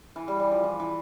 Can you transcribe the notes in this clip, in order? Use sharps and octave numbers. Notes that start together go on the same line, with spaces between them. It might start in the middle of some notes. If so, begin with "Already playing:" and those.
E3
G3
G3
F3
E3
E3